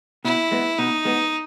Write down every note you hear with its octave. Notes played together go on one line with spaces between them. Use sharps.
B2 E4
G#3 B3
B2 D#4
G#3 B3